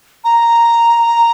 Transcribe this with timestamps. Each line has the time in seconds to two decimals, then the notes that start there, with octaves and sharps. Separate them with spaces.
0.24 A#5